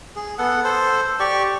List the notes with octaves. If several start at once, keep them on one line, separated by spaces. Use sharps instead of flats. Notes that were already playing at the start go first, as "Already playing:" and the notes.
G#4
B3 A4 F#5
A4 C5
G4 D5 C#6